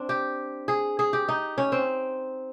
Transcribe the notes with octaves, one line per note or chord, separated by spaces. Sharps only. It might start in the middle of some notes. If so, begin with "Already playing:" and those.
Already playing: C4 D4
G4
G#4
G#4
G4
D#4
C#4
C4